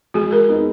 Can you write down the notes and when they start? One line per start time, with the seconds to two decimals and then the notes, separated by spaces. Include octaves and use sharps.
0.14 G#3 F#4 G#4
0.31 G#4 A#4
0.49 B3 D#4